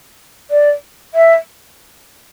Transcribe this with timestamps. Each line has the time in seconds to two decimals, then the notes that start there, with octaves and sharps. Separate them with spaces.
0.50 D5
1.14 E5